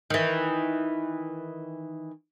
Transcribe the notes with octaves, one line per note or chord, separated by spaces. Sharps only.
D#3 E3